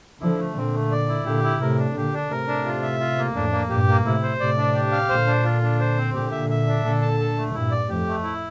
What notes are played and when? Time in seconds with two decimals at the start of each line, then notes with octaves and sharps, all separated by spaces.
0.21 D3 F3 E4
0.39 A3
0.56 A#2 D3 C4
0.74 A3
0.91 D5
1.08 E4
1.26 A#2 D3 G4
1.43 E4
1.60 A2 C3 A#4
1.78 D4
1.95 A#2 D3 G4
2.14 D4
2.31 A2 C3 A#4
2.48 D4
2.66 F4
2.82 E5
3.00 F4
3.18 A#3
3.35 F2 A2 D4
3.52 A#3
3.70 G2 A#2 G4
3.88 A#3
4.05 A2 C3 E4
4.23 C5
4.39 A2 C3 D5
4.58 D4
4.75 G4
4.92 F5
5.09 A#2 D3 C5
5.27 D4
5.44 F4
5.62 D4
5.80 C5
5.97 C4
6.14 A#2 D3 G4
6.32 E5
6.50 E5
6.67 D4
6.84 A#2 D3 A4
7.02 A5
7.20 A4
7.37 A3
7.54 G2 A#2 E4
7.71 D5
7.89 F2 A2 G4
8.07 A3
8.23 E4